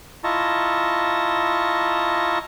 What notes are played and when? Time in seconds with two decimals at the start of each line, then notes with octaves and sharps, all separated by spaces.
0.24 E4 F4 D#5 A5 A#5 C#6